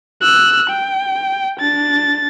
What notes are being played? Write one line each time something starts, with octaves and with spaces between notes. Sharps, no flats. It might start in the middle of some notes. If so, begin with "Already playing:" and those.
E6 F#6
G5
D4 A6